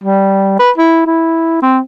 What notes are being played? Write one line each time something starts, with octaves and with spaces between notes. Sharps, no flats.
G3
B4
E4
E4
C4